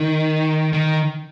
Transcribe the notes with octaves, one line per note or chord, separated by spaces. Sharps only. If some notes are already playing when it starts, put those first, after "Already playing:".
Already playing: D#3
D#3